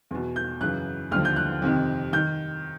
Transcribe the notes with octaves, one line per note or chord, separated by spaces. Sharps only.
E2 B2
G6
F#2 C#3 E3 F#6
D#2 D3 F3 F6
G6
F#6
F2 C3 D#3
D#3 G6